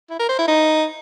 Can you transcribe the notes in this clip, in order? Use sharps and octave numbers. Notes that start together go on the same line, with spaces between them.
E4
A#4
C5
E4
D#4